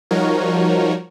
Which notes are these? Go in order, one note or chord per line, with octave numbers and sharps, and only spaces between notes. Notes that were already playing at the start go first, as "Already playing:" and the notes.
F3 G3 D#4 F#4 A#4 C#5